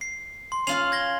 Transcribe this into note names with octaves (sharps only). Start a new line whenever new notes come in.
C7
C6
C#4 F4 F5 C7 F7 F#7
G#6 A#6 G7